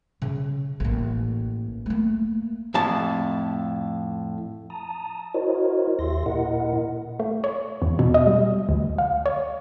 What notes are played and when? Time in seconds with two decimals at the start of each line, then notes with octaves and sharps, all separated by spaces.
0.22 C#3
0.80 A1 A#3
1.86 A3 A#3
2.74 F2 A2 A5
4.70 A5 A#5 D#6
5.34 E4 F#4 A#4 C5 C#5 D#5
5.99 D#2 G4 E5 C6 A#6
6.26 A#2 E4 A#4 D#5 F#5
7.20 A3
7.44 C#5
7.82 E2
7.99 B2
8.14 D#5
8.27 G3
8.69 D2
8.98 F5
9.26 C#5